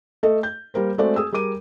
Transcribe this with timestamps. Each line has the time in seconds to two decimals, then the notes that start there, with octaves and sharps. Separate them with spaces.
0.23 A3 A4 D#5
0.43 G6
0.74 G3 A#3 A#4 C5
0.98 G#3 A3 C4 F#4 D5
1.16 G#4 D#6 E6
1.32 G3 G#4 A#4 D6 D#7